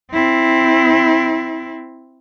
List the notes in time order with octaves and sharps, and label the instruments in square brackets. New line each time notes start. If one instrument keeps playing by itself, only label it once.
[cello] C4 E4